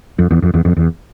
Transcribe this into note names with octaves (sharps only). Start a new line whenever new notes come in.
F2
E2
F2
E2
F2
E2